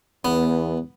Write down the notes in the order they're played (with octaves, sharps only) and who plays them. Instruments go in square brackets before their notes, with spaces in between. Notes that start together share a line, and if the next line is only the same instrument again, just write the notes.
[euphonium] E2 [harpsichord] B3